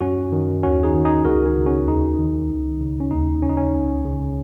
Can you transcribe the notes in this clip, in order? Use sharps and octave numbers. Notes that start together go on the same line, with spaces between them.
F#2 C#4 F#4
D#3
D#2 C#4 F#4
D#4 G#4
D#3
D#4 G#4
C#2 F#4 A#4
D#4 G#4
C#3
C#4 F#4
D#2 D#4
D#3
C#2
C#3
C#4
D#2 D#4
C#3 C#4
D#4
C#4
C#2
C#3